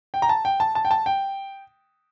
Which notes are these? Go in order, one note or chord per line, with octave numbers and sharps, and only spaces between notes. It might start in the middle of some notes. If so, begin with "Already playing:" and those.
G5
A#5
A5
G5
A5
A5
G5
A5
G5